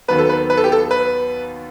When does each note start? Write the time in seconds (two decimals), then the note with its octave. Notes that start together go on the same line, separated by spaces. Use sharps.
0.08 D#2 D#3 F#3 B3 B4
0.18 A4
0.29 B4
0.50 B4
0.57 A4
0.64 G4
0.72 A4
0.91 B4